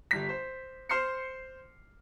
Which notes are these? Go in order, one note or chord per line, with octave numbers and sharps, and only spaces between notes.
G1 G3 B6
C5
C5 C6 F6 C7 C#7